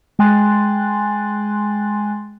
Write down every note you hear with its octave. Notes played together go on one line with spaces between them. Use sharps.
G#3 G5 G#5 C6 F#6 A6